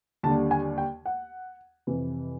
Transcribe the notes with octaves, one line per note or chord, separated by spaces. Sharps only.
D#2 D3 G3 A5
G#5
G5
F#5
F2 C3 E3